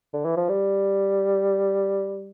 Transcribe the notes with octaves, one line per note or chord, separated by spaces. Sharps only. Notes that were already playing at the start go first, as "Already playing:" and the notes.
D3
E3
F3
G3